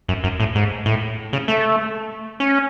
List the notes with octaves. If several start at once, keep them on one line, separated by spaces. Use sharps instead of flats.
F#2
F#2
A2
G#2
A2
C#3
A3
C#4